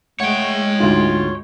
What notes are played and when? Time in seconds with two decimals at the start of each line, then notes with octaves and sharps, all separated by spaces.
0.20 G#3 A3 C#5 F#5 G5
0.80 D2 G#2 F4